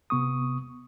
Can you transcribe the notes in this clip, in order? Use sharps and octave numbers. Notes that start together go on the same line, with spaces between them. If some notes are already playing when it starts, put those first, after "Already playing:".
C3 B3 C#6 D#6